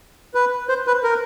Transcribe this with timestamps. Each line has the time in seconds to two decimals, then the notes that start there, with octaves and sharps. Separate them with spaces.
0.35 B4
0.69 C5
0.87 B4
1.04 A#4